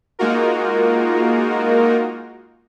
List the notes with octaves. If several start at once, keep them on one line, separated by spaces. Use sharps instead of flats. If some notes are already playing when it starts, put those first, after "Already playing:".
G#3 A#3 D#4 F4 F#4 A#4